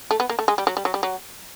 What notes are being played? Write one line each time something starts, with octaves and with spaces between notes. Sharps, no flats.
A3
B3
A#3
A3
G#3
G3
F#3
G3
F#3
G3
F#3